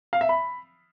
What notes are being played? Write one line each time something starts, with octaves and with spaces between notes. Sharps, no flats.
F5
E5
B5